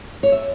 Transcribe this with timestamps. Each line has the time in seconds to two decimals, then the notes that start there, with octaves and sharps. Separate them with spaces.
0.23 C#5
0.32 E5